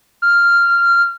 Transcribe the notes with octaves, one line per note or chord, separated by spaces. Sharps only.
F6